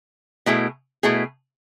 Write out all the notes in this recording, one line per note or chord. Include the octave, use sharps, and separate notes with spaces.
B2 A3 E4 G#4
B2 A3 E4 G#4